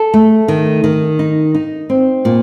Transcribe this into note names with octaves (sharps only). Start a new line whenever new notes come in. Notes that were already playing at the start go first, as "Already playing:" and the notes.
Already playing: A4
A3
D#3
D#3
D#4
D#4
C4
A#2